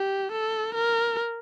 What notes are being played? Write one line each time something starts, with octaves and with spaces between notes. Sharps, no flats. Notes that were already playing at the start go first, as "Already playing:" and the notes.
Already playing: G4
A4
A#4